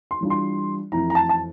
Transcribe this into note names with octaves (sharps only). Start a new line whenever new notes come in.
C6
E3 G3 D4 F4
C6
F2 E3 A3 E4 A#5
A#5
A5
A5